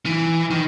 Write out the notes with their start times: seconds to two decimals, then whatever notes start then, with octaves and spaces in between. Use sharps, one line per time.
0.06 E3
0.50 D#3